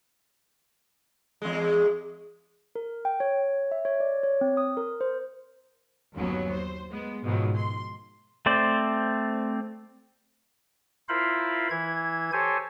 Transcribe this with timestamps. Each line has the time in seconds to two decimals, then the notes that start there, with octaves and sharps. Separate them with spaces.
1.42 E2 G#3
2.76 A#4
3.05 G5
3.20 C#5
3.72 E5
3.85 C#5
4.00 D5
4.23 C#5
4.41 C4
4.57 D#6
4.77 A#4
5.01 C5
6.14 G1 D#2 F#3 B3 C#4
6.51 C5
6.89 G#3 B3
7.24 G#2 B2 D#3 F3 F#3
7.54 C6
8.46 A3 C4 C5 D5
11.09 E4 F4 A#4 C5 F5 B5
11.70 E3 E4 G#6
12.33 G4 A4 C5 C#5 G#5